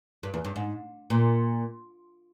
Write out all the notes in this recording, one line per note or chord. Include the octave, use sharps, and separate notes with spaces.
G2
E2
G2
G#2
A#2